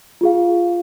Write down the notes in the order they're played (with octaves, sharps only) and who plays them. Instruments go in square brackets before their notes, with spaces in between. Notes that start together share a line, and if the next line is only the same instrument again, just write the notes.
[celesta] F4 G#4 F5